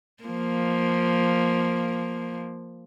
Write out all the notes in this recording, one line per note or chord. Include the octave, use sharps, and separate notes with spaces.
F3 A#3